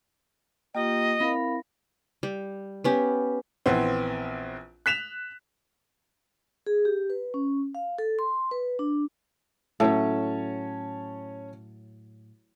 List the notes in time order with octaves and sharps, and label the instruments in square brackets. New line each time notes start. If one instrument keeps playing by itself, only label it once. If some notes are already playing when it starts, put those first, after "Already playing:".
[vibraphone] A#3 F4 G4 [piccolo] D#5 [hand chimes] G5
[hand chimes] C4 E4 A#6 [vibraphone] A#4 F5 B5
[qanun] G3
B3 C#4 G4
[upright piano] A#1 E3 B3 C4
F#6 B6 E7 F7
[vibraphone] G#4
G4
B4
C#4
F5
A4
C6
B4
D4
[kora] A2 F#3 [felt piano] C#4 C#5 A5